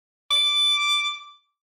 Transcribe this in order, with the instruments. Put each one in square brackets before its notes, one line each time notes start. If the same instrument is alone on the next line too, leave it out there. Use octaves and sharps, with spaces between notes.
[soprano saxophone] D6